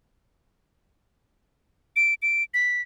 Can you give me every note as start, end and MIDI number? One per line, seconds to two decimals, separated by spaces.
1.96 2.14 98
2.22 2.43 98
2.54 2.82 95